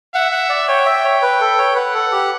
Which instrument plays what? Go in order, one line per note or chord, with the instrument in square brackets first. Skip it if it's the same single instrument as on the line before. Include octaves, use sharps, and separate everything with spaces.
[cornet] E5 [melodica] F#5
[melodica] F#5
D5
[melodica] C#5 [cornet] G5
[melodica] E5
C#5
B4
A4
C#5
[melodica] B4 [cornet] F#5
[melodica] A4
G4